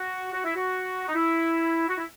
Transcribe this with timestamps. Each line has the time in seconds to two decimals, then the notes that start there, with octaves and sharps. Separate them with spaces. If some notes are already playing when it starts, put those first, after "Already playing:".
Already playing: F#4
0.32 F#4
0.44 E4
0.55 F#4
1.09 D#4
1.15 E4
1.88 F#4
1.98 E4